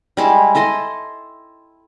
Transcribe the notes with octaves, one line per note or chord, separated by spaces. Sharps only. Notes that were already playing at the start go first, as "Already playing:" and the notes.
G3 G#3 E4
E4 A4 D#5 C6